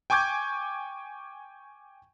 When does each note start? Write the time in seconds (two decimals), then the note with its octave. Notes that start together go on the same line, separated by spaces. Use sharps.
0.10 G5 G#5 C#6 D6 G6 G#6